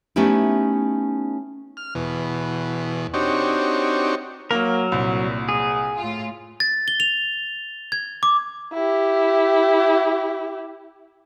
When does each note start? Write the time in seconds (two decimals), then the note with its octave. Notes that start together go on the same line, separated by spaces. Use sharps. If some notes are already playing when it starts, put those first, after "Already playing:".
0.16 A3 B3 C#4 D#4 E4 G4
1.77 F6
1.95 E2 B2
3.14 C4 D4 D#4 F#4 G4 C#5
4.51 F#3 A#3 A#4
4.92 C2 A#2
5.49 G#4
5.97 A2 F4
6.60 A6
6.88 G7
7.00 F7
7.92 G#6
8.23 D6
8.74 E4 G4